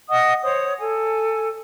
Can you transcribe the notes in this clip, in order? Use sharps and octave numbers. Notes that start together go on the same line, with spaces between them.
D#5 F#5 D#6
C5 C#5 D#6
A4 G#5